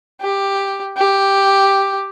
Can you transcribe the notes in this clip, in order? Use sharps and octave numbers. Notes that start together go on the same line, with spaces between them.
G4
G4